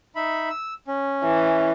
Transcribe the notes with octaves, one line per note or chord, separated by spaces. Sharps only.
D#4 E5 B5
E6
C#4
E3